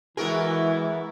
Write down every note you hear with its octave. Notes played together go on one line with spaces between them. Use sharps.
E3 G#3 B3 E4 F#4 G#4 A#4